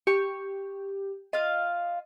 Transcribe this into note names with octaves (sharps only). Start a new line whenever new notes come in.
G4 C#6
F4 D#5 F5